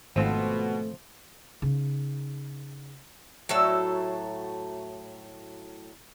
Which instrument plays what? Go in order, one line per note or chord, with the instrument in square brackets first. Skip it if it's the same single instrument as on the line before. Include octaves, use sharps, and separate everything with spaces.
[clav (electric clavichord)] G#1 [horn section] B2 [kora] F3 C4 [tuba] A3
[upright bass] C#3 D#4
[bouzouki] A2 F#3 A4 E5